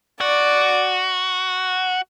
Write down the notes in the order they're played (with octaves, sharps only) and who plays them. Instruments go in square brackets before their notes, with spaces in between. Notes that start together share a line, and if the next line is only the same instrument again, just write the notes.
[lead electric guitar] F#4 [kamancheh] D5